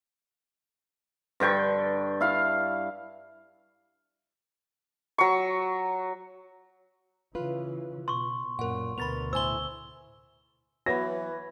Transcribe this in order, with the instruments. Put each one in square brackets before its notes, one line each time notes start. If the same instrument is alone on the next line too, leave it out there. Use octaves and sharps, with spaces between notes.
[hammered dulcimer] G2 D3 G5 C#6
E4 F5
[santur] F#3 C#6
[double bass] C#3 E3 [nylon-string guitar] F4 B4
[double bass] B2 [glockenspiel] C6 C#6
[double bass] F#2 [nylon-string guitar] A#2 [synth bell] A#4 F#5
[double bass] D2 B2 [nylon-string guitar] B3 A#4 [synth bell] B5 A6 F7
[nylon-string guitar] A2 E4 [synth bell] C5 G#5 C6 [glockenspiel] E6 G7
[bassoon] E3 [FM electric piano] F#3 B3 [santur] B4 C#5 [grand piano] A#6